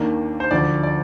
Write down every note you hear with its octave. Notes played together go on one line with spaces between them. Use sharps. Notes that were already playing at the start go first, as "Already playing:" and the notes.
Already playing: D#2 D#3 A#3 D4
C5
D2 D3 F3 D5
D5